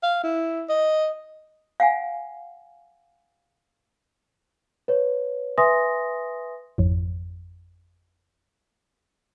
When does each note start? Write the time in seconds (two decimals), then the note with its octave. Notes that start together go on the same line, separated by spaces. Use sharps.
0.03 F5
0.24 E4
0.69 D#5
1.80 F5 F#5 G#5
4.88 B4 C#5
5.58 B4 E5 G#5 C6 D#6 A#6
6.78 G#1 F2